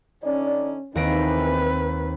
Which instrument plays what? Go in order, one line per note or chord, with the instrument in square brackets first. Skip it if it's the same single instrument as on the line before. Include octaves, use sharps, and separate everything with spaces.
[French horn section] D3 D#4 D5 [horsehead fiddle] C#4
[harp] D#2 A#6 D7 [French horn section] C#3 E3 D#4 [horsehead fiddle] C4 B4